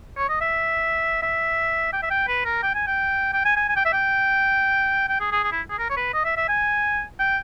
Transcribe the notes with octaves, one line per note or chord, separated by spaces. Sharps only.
C#5
D#5
E5
E5
G5
E5
G5
B4
A#4
G5
G#5
G5
G5
G#5
G#5
G#5
G5
E5
G5
G5
G#4
G#4
G#4
E4
G#4
A#4
C#5
B4
D#5
E5
E5
G#5
G5